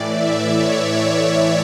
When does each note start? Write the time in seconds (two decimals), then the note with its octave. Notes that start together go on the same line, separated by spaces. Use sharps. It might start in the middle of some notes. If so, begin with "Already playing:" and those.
Already playing: A2 E3 D5
0.08 E5
0.51 C#5
0.94 C#5